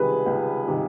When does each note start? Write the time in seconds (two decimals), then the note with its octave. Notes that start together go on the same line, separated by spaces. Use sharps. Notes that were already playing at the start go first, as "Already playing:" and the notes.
Already playing: C#2 C3 D#3 G3 G#4 B4
0.26 C#2
0.67 C3 D#3 G3